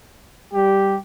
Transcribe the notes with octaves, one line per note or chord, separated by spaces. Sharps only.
G3 G4